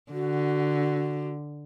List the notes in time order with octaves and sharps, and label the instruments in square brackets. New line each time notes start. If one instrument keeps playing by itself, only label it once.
[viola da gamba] D3 [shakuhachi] F#4